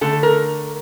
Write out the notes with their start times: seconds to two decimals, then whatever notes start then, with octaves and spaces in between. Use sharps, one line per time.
0.01 D3 A3 A4
0.23 A#4